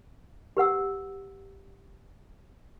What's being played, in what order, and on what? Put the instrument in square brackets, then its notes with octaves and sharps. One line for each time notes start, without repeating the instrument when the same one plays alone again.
[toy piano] G4 B4 F#5 E6